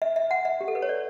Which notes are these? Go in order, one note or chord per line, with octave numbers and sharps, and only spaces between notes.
E5
E5
F#5
E5
G4
A4
B4
C#5
D5